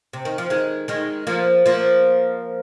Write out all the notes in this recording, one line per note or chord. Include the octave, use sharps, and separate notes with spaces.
C3
D#3
F3
D#3 G#3
D#3 G#3
F3 A#3
F3 A#3